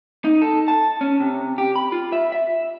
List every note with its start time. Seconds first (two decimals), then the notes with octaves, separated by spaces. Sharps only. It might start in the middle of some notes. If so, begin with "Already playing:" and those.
0.24 D#4
0.42 A4
0.68 A5
1.01 C#4
1.20 C3
1.58 G4
1.76 B5
1.92 F4
2.12 E5
2.32 E5